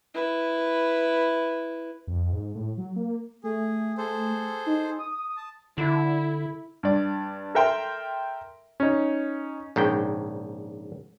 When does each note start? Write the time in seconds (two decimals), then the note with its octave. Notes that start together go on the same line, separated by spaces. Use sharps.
0.15 E4 B4
2.07 F2
2.33 G#2
2.55 A2
2.78 F#3
2.96 A#3
3.44 A3 G#4
3.98 G#4 A4 C5
4.66 D#4
4.99 D#6
5.37 A5
5.78 D3 E4
6.83 G2 D5
7.55 A4 A#4 E5 G5 A#5 C6
8.80 C#4 D#4
9.76 A#1 G#2 C#3 G5